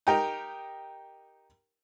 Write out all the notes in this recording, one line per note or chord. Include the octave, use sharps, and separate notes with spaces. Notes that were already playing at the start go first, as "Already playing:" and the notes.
D#4 G4 A#4